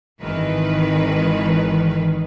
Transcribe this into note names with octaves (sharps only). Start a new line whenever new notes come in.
G#1 D#3 E3 B4